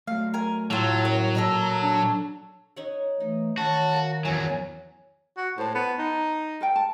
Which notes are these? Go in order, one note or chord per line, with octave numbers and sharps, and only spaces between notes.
F#3 A3 F5
A#4 G#5
A2 F#3 F4 A4
C#4 E4 A#4 C#5
A#2 A4 A#4 D#5
D4
D#4 C#5 F#5
E3 A3 D#4
D#3 C#4 F#4 A5
A#3 F#5
E2 E3 F#3 C#4 G#5
F#4
A2 C5 A5
B3
D#4
A4 A#4 G5
A5